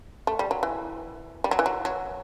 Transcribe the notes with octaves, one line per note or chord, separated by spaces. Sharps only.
A3
G3
F#3
E3
G3
F#3
E3
F#3
F#3